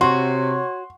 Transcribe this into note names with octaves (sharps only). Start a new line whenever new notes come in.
C3 F#4 C#5 C6